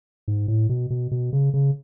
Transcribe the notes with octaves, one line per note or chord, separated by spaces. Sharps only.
G#2
A2
B2
B2
B2
C#3
C#3